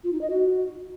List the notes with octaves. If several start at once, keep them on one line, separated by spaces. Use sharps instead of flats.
F4
D#4
D#5
F#4